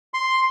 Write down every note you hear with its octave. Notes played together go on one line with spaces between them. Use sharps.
C6